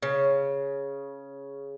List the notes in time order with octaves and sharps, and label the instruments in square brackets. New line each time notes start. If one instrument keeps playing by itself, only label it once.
[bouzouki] C#3